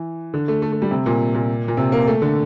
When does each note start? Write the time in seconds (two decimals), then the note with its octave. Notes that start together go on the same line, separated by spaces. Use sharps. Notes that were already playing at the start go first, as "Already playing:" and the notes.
Already playing: E3
0.34 D3
0.48 A3
0.62 A3
0.72 A3
0.82 G3
0.91 C3
1.06 A#2
1.34 A#2
1.68 A#2
1.77 C3
1.92 A#3
2.07 A3
2.22 D3